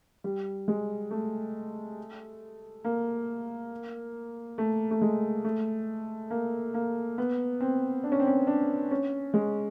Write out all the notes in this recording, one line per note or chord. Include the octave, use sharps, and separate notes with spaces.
G3
G#3
A3
A#3
A3
A3
G#3
A3
A#3
A#3
B3
C4
D4
C#4
C4
C#4
D4
C#4
G#3